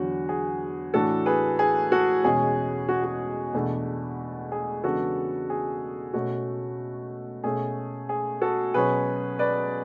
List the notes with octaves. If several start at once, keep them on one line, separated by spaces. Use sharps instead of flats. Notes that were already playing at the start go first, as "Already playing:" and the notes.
Already playing: E2 D3 F#3 F#4
G#4
A2 E3 A3 D4 F#4 A4
G#4 B4
G#4
F#4 A4
E2 B2 G#3 C#4 G#4
F#4
F#4
E2 B2 A3 D4
G#4
E2 C#3 G#3 B3 D4 F#4 A4
G#4
B2 A3 C#4 F#4
B2 A3 C#4 G#4
G#4
F#4 A4
B2 F#3 C#4 G#4 B4
B4 D5